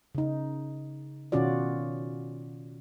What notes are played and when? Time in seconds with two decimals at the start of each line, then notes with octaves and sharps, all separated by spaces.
0.15 C#3 D#4
1.32 B2 D#3 C#4 F4 F#4 D5